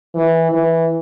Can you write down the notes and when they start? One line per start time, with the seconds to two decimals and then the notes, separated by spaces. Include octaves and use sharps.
0.15 E3
0.52 E3